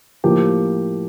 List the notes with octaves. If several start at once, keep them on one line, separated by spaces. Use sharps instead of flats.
A2 F3 A#3 G4